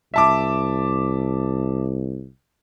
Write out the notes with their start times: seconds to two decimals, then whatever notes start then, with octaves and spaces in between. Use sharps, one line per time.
0.14 C2 E5 A5 D6